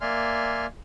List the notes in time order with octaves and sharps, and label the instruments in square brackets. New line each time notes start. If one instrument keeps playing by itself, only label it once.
[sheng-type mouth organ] A#3 D5 E5 G#5 C6 F6